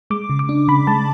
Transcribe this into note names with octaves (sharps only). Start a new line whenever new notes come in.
G#3 D6
C#3
D6
D4
C#3 B5
G#3 A5